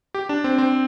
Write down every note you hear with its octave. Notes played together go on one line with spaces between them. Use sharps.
G4
D4
C4
C4